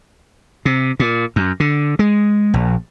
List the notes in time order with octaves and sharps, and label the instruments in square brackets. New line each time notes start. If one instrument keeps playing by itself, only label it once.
[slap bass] C3
A#2
F#2
D3
G#3
A#1